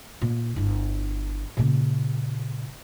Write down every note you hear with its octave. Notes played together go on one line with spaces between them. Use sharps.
A#2
G1 E4
A#2 C#3